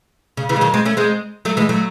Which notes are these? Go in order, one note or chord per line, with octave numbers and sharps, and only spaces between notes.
C#3
C#3 E3
G#3
D#3 F#3
G#3 C4
A3 C#4
G#3 C4
F#3 A3
E3 G#3
F#3 A3